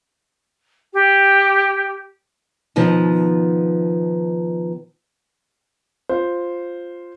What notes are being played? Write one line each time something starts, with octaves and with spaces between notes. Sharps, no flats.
G4
B2 D#3 F3 B3
F4 C5